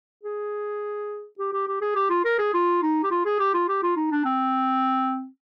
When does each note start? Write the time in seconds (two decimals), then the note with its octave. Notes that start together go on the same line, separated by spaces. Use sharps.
0.24 G#4
1.39 G4
1.53 G4
1.68 G4
1.81 G#4
1.95 G4
2.10 F4
2.25 A#4
2.38 G#4
2.54 F4
2.82 D#4
3.03 G4
3.11 F4
3.25 G#4
3.40 G4
3.54 F4
3.68 G4
3.83 F4
3.96 D#4
4.11 D4
4.25 C4